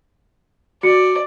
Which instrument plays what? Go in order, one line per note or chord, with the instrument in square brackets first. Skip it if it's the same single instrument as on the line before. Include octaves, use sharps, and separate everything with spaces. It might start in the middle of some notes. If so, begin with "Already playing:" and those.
[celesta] F#4 C#7 [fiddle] D5